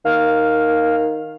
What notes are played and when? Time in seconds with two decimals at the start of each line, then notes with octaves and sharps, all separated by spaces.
0.05 D#3 F5